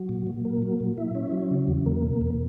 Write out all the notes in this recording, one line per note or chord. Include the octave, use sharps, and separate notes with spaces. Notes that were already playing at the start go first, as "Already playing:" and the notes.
Already playing: F#3
A#2
A#2
A#3
F#3
A#2
E4
C#4
F#3
C#3
E2
A#3
B2
E2